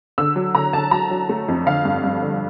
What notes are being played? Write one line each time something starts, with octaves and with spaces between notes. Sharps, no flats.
D3 E6
F#3
D3 A#5
D3 A5
F#3 A#5
F#3
A3
F2
D3 F5
G2
G2
D3